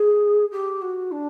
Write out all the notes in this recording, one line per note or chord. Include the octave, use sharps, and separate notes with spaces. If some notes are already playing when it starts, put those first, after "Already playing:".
Already playing: G#4
G4
F#4
D4